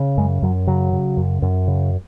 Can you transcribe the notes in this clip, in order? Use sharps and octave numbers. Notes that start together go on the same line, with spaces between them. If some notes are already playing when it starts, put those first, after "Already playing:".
Already playing: C#3
F#2 G#3
F#2 F#3
C#3 F#3
C#3
F#2
F#2
C#3